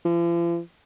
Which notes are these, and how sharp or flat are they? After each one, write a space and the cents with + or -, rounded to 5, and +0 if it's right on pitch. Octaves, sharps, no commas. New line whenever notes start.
F3 -45